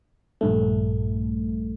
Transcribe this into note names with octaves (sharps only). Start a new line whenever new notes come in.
A#1 G2 A3